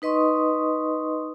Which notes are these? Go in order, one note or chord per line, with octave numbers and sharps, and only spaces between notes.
D#4 B4 D#5 C6 C#6 D#6